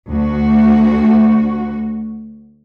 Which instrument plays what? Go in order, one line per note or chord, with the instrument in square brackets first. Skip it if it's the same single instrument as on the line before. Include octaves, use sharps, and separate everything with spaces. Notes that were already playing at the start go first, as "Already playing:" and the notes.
[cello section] D2 F#4